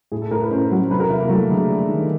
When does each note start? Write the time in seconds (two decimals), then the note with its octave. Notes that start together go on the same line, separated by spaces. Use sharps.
0.12 A2 G#4
0.22 A4
0.31 A2 A#4
0.41 B4
0.51 C#4 C5
0.71 F#3
0.90 C3 B4
1.00 A#4
1.10 E3 E4
1.20 A#3
1.29 F#3 A3
1.50 D3 G#3
1.69 G3
1.89 D#3